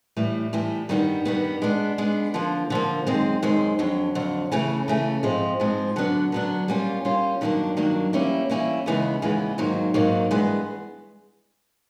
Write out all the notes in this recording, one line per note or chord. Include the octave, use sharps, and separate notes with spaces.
A2 E3 G3
A2 E3 G3
G2 D#3 G3 B3
G2 D#3 G3 B3
G#3 B3 D4
G#3 B3 D4
D3 F3 A#3
D3 F3 A#3
F#2 D#3 G#3 C4
F#2 D#3 G#3 C4
F2 D3 F#3
F2 D3 F#3
C#3 E3 A3 C#4
C#3 E3 A3 C#4
G#2 F3 G#3 C4
G#2 F3 G#3 C4
D3 F#3 B3 D4
D3 F#3 B3 D4
G3 A#3 C#4 F4
G3 A#3 C#4 F4
G2 D#3 F#3 A#3 D4
G2 D#3 F#3 A#3 D4
E3 G3 A#3 C#4 E4
E3 G3 A#3 C#4 E4
D#2 C#3 E3 G#3 B3
D#2 C#3 E3 G#3 B3
G#2 D#3 F#3 A#3 D#4
G#2 D#3 F#3 A#3 D#4
G2 E3 G#3 B3